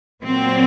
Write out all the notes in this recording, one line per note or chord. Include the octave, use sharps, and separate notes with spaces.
A#2 F#3 A#3 C4